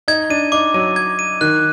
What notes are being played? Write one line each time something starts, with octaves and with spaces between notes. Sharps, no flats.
D#4 G#6
D4 D#7
D#4 D6
F#3 D#7
G#6
D#7
D#3 F#6